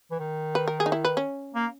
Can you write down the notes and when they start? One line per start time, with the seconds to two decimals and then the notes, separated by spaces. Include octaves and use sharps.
0.11 E3
0.19 D#3
0.55 B4
0.68 A#4
0.80 G#4
0.86 D#4
0.92 E4
1.05 B4
1.17 C#4
1.55 A#3